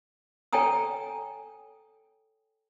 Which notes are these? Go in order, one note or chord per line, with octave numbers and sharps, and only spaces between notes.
A4 C#5 G5 G#5 A#5 D#6